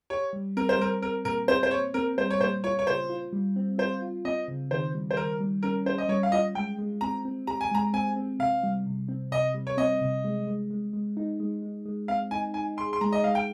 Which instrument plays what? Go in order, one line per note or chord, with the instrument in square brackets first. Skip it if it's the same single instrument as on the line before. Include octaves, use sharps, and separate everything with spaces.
[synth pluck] G4 [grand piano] C#5
[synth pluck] G3
[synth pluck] C4 [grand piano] A#4
[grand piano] C5
[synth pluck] G3 [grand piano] A#4
[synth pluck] C4 [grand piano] A#4
[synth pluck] A#2 [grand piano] A#4
[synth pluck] C4 [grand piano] C5
[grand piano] C5
[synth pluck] A#2 [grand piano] C#5
[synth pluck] C4 [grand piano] A#4
[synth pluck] G3 [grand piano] C5
[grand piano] C#5
[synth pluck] A#2 [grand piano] C5
[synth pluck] F4 [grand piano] C#5
[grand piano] C#5
[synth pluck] C#3 [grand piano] C5
[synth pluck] F4
G3
C4
[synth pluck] F4 [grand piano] C5
[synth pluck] F4
[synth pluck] C4 [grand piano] D#5
[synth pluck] C#3
[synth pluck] D#3 [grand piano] C5
[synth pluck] G3
[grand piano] C5
[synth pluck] D#3 [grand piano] A#4
[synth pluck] G3
[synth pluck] C#4 [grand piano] A#4
[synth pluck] C#4 [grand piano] C5
[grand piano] D#5
[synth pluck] G3 [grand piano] C#5
[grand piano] F5
[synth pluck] F4 [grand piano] D#5
[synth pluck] G#3 [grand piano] G5
[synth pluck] G#3
[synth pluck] C4 [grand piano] A#5
[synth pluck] C4
[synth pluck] G4 [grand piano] A#5
[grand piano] G#5
[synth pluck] G#3 [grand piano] A#5
[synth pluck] C4 [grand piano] G#5
[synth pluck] C4
[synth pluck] C3 [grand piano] F5
[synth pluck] G3
C3
C4
[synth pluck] C3 [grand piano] D#5
[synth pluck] G3
[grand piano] C#5
[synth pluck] C4 [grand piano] D#5
[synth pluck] C3
G#3
G#3
G#3
G#3
D#4
G#3
G#3
G#3
[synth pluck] C4 [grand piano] F5
[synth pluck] D#4 [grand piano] G#5
[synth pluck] D#4 [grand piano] G#5
[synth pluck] G#4 [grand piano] C6
[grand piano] C6
[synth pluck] G#3 [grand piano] A#5
[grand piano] D#5
[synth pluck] G#3 [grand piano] F5
[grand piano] G5